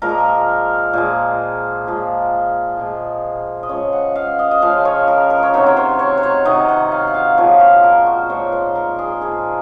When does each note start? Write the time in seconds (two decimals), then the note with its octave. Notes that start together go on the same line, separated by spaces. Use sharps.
0.02 A#2 F3 G#3 A#4
0.93 A#2 F3 G#3
1.86 A#2 F3 G#3
2.78 A#2 F3 G#3
3.63 D#5
3.69 C#3 F3 G#3 C#5
3.92 F#5
4.16 F5
4.39 D#5
4.51 D#5
4.62 C#3 F3 G#3 F5
4.85 C#5
5.08 A#4
5.30 A#4
5.43 C#5
5.54 C3 D#3 F#3 C5
5.66 C#5
5.77 C5
5.99 C#5
6.17 C5
6.23 C#5
6.45 C3 D#3 F#3 D#5
6.68 F#5
6.92 F5
7.07 F#5
7.14 F5
7.38 A#2 F3 G#3 C#5
7.60 C5
7.83 A#4
8.06 F#4
8.30 A#2 F3 G#3 C#5
8.52 C5
8.75 A#4
8.99 G#4
9.21 A#2 F3 G#3 G#4